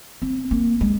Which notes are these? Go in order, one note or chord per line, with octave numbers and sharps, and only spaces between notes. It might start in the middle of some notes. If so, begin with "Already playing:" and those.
C4
A#3
G#3